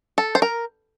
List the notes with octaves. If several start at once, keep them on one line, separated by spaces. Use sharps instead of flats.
A4
C5
A#4